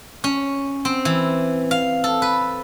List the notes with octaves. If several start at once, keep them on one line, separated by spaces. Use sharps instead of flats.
C#4
C4
E3
F5
A4
B4